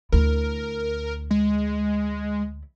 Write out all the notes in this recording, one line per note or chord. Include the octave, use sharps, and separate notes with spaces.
D2 E4 A#4
G#3